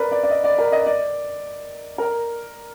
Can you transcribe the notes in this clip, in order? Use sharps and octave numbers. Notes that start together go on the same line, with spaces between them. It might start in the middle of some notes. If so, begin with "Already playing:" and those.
Already playing: A#4 B4 D5
D5
D5
D#5
D5
A#4
D#5
D5
A#4